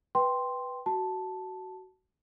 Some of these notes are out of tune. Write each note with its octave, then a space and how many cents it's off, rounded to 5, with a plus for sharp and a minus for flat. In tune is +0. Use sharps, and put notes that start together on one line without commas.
B4 +0 G5 +0 C6 +0
F#4 +15 A5 +0